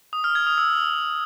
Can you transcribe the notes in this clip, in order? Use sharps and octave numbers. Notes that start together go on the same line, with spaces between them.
D#6
F6
G#6
D#6
E6